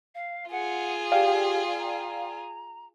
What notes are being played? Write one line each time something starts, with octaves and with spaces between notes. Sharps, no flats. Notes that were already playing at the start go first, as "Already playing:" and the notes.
F5
F4 G#4 F#5
G4 D5 F5 G5
A#5